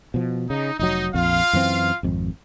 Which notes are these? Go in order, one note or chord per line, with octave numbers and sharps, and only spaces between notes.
B2 F3
C#3 D#4
F1 F#3 D#4
A#1 F2 F4 F5
F#2 E3 C4
G#1 F2